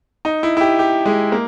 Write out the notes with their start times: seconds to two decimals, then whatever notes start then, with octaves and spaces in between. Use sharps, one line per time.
0.25 D#4
0.43 E4
0.57 E4
0.61 G4
0.79 G4
1.06 G#3
1.32 A#3